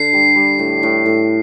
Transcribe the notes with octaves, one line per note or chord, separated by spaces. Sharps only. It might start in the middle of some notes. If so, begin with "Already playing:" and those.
Already playing: D3 C7
G3
G3
A2
A2
A2